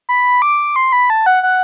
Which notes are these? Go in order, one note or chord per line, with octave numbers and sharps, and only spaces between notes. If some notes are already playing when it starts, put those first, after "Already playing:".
B5
D6
C6
B5
A5
F#5
F#5